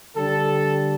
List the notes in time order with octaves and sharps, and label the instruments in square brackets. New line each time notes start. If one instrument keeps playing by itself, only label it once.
[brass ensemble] D3 G3 A4